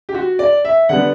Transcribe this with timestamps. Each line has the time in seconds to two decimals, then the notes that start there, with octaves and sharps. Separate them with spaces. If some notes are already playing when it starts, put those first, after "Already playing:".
0.09 G4
0.14 F#4
0.39 D5
0.65 E5
0.89 D3 G3 B3 F#5